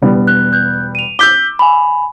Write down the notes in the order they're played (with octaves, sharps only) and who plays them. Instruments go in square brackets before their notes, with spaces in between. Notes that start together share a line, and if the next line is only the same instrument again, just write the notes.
[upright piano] E1 G3 B3
[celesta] F#6
F#6 G6
D#7 F7
[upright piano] D6 E6 [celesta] G6 B6 G7
[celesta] G#5 B5